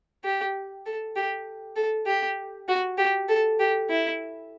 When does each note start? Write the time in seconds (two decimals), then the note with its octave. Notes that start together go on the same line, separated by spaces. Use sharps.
0.24 G4
0.86 A4
1.16 G4
1.76 A4
2.07 G4
2.68 F#4
2.98 G4
3.28 A4
3.59 G4
3.90 E4